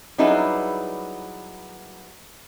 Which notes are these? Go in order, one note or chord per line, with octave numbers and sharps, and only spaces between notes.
F#3 G3 D#4 E4 G#4 B4